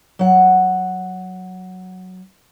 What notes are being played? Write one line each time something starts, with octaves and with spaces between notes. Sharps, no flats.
F#3 F#5